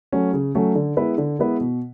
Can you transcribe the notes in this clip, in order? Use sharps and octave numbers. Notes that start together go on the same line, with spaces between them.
F#3 A3 C#4
C#3
F#3 A3 C#4
D3
G#3 B3 E4 B4
D3
G#3 B3 E4 B4
B2